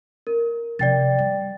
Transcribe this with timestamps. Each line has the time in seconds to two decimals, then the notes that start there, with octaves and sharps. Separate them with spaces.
0.27 A#4
0.79 C3 F3 D5 G5 A6
1.18 G3